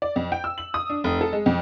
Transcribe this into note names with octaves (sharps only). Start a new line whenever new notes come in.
D5
F2
G5
E6
F#7
D#6
D4
F1
A4
G#3
F2